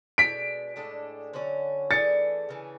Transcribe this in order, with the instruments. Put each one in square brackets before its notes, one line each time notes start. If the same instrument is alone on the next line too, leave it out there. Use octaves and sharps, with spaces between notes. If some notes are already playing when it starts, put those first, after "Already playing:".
[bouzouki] B2 G#3 D4 A4 [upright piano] B6 D7
[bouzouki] A2 G#3 D4 A4
D3 F#3 C#4
[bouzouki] E3 A3 D4 G#4 [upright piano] A6 C#7
[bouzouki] C#3 E3 A3